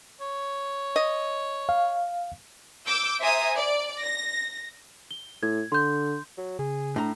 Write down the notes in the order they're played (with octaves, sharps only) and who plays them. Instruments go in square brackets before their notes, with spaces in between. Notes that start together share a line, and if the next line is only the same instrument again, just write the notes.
[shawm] C#5
[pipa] D#5
[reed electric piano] F5
[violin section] D6 E6 G6
C5 E5 G#5 A#5 D#6
D5
A#6
[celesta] G7
[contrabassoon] A2 [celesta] G#6
[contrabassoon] D3 [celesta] C6 G6
[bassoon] F#3
[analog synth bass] C#3 [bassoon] G#4
[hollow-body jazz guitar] A2 A#5 [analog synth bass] D4